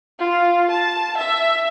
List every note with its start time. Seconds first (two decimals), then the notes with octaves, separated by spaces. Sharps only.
0.19 F4
0.71 A5
1.17 E5